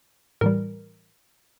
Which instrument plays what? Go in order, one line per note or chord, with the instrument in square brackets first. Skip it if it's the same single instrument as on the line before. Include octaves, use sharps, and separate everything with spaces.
[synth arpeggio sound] A2 E3 G3 A#4